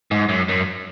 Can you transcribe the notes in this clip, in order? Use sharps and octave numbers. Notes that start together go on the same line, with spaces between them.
G#2
F#2
F#2